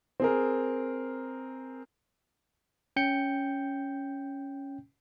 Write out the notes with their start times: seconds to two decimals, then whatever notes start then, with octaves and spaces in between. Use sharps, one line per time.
0.20 C4 G#4 A#4
2.96 C#4 G5 G6 C#7